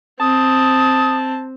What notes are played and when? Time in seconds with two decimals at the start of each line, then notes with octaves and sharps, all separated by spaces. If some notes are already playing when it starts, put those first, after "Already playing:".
0.20 C4 A5 D#6